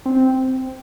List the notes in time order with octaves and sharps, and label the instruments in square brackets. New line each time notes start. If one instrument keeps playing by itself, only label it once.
[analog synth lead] C4